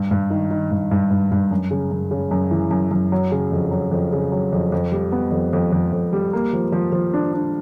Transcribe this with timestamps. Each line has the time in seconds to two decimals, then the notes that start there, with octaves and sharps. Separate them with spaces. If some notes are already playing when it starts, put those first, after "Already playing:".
Already playing: G2
0.11 G2
0.30 D#3
0.51 D#3
0.71 G2
0.91 G2
1.11 G2
1.32 G2
1.51 F#2
1.71 C#3
1.91 F#2
2.11 C#3
2.31 F#2
2.51 E3
2.71 F#2
2.91 F#2
3.12 F#3
3.32 C#3
3.52 F2
3.71 F#3
3.91 F2
4.12 C#3
4.32 F#3
4.53 F2
4.72 F2
4.92 G3
5.12 B3
5.32 F2
5.53 F2
5.72 F2
5.92 F2
6.13 G3
6.33 A#3
6.53 F3
6.72 F3
6.92 F3
7.14 D4
7.33 D4